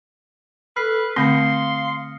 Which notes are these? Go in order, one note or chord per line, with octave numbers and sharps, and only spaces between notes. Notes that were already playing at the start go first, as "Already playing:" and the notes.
A4 B4 F6 C7
D3 A3 C4 F5 C6 D#6 A#6 C#7